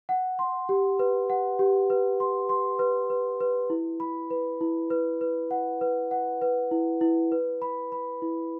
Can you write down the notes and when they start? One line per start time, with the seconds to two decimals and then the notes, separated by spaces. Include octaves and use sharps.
0.09 F#5
0.39 C6
0.69 G4
0.99 B4
1.30 F#5
1.59 G4
1.90 B4
2.20 C6
2.49 C6
2.79 B4
3.10 B4
3.40 B4
3.70 E4
4.00 B5
4.31 B4
4.61 E4
4.90 B4
5.21 B4
5.51 F#5
5.81 B4
6.11 F#5
6.42 B4
6.71 E4
7.01 E4
7.32 B4
7.62 B5
7.92 B5
8.22 E4